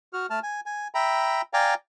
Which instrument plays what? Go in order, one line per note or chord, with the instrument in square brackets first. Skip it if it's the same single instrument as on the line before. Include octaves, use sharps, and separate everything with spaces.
[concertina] F#4 F6
A3 A5 F6
G#5
G#5
E5 G5 A#5 B5
D5 F5 G5 G#5 A#5